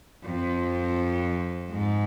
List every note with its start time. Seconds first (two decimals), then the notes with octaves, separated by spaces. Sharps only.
0.24 F2
1.71 G#2